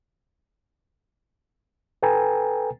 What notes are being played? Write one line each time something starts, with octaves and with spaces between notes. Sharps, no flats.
A4 B4 G5 G#5 A#5